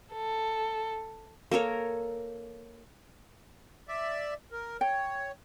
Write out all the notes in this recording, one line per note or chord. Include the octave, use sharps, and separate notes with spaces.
A4
A#3 A4 A#4 C#5
D5 E5
A#4
C#5 G5